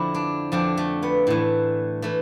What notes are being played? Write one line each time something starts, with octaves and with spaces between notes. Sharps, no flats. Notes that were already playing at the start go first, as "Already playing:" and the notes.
Already playing: F2 D3 F3 E4
D4
F2 D3 F3 D4
A3
B3
A2 E3
E3 A3